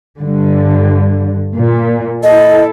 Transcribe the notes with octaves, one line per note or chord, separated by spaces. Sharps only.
G2 D3
A#2
E4 A4 D#5